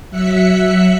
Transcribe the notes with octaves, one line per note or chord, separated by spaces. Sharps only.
F#3 E5 F#6 B6 C#7